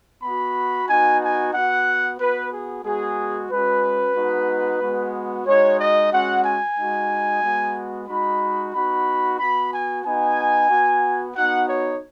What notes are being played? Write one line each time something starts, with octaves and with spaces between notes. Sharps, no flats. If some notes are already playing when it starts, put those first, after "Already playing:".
B3 F#4 B5
B3 D#4 F#4 G#5
G#5
B3 F#4 F#5
B3 F#4 B4
G#4
G#3 B3 F#4 G#4
G#3 C#4 F#4 B4
G#3 B3 D#4 F#4
G#3 B3 F#4
G#3 D#4 F#4 C#5
D#5
G#3 C#4 F#4 F#5
G#5
G#3 D#4 F#4
G#3 B3 F#4
G#3 D#4 F#4 B5
B3 D#4 F#4 B5
B3 F#4 B5
G#5
B3 D#4 F#4 G#5
B3 F#4
B3 D#4 F#4 F#5
C#5